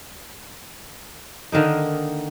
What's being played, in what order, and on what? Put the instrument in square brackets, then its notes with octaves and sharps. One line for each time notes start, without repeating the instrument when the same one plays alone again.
[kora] D3 D#3 A#3 D#4